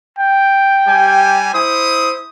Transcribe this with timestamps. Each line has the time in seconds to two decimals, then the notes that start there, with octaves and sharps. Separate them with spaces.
0.19 G5
0.87 G3 G4 G#5
1.53 E4 C5 D#6